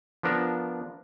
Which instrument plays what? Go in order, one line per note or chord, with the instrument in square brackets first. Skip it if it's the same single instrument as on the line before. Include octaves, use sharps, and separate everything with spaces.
[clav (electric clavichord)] F3 B3 D4 A#4